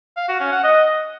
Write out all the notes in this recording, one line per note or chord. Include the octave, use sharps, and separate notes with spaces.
F5
F#4
C#4
F#5
D#5